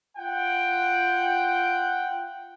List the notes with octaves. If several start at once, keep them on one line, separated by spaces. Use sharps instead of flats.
F4 F#5 G5